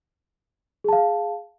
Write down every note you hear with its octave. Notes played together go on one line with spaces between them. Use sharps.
G#4 F5 A5